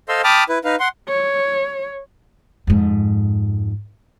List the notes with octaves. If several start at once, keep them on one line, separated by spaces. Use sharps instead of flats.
A4 C5 D#5 F5 C6 E6
G5 A5 B5 D6 D#6 F6
E4 B4
D#4 B4 F5
F#5 C6
C#5
F2 G#2